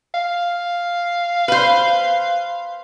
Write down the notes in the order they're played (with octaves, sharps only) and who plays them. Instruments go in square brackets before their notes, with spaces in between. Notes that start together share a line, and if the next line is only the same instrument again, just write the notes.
[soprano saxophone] F5
[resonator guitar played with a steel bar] B4 C5